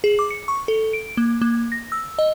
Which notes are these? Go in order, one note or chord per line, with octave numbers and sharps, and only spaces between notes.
G#4
D6
C#7
C#6
A4
D7
A#3
A#3
A#6
E6
D#5